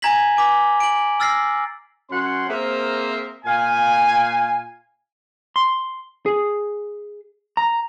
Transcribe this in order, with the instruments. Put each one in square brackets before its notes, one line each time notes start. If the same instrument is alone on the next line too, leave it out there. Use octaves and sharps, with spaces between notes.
[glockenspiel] G#5 A#5 G#6 A#6 B6 F#7
G#5 D6 B6
D7 F#7
E6 F6 A6 A#6 C7
[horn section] F#2 C#4 F#5 C6
A#3 C4 G#4 A#4 C5 E5
A#2 F4 F5 G#5
[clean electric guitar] C6
G#4
A#5